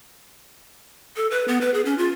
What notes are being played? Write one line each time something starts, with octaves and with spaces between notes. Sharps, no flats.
A4
B4
B3
B4
G#4
C#4
F4